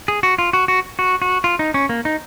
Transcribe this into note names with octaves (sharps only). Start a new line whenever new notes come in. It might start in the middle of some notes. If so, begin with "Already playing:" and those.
G#4
F#4
F4
F#4
F#4
F#4
F#4
F4
D#4
C#4
A#3
D#4